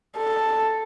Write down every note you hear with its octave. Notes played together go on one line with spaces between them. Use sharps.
A4